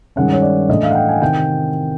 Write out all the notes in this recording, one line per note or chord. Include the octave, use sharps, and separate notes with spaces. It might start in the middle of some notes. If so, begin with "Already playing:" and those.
G2 D#3 G#3 C#4 F#5
C#5
D5
A2 E3 A3 D4 D#5
F5
F#5
G5
G#5
C3 D#3 G5